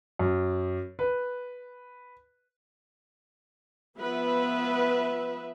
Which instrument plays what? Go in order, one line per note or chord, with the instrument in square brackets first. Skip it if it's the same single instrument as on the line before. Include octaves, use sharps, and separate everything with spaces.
[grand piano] F#2
B4
[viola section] F3 B3 B4 E5